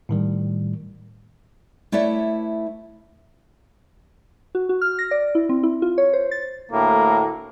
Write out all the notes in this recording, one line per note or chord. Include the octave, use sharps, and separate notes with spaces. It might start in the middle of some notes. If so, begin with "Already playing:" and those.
A2 D#3 G3
A3 E4 B4 C#5 D5 E5
F#4
F#4
F6
A#6
D5
E4
C4
E4
F4
C#5
C5
A6
D2 A2 A#3